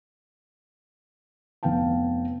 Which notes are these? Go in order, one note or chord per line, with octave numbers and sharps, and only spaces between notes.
F1 B3 F5 G5 A5